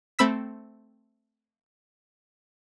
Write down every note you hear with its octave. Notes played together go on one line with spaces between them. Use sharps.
A3 C4 B5 E6 B6